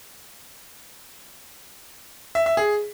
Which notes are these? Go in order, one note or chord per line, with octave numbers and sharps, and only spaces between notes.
E5
E5
G#4